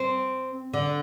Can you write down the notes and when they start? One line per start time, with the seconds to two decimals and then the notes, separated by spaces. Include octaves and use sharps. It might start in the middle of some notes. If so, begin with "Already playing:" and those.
Already playing: C4
0.73 D3